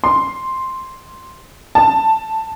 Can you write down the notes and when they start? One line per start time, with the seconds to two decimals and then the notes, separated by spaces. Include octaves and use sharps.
0.04 C6
1.75 A5